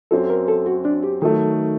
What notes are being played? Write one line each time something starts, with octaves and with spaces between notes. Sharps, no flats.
F#2 F#3 C4 A4
A#4
A4
F#4
D4
G4
D#3 F#3 A3 A4